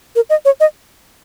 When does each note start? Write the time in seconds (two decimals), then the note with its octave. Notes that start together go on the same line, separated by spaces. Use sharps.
0.16 A#4
0.30 D#5
0.45 C#5
0.60 D#5